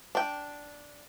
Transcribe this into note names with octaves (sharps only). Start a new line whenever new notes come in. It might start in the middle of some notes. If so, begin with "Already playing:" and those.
D4 G5